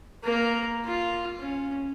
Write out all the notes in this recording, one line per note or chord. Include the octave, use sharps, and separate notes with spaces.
A#3 A#4
F4
C#4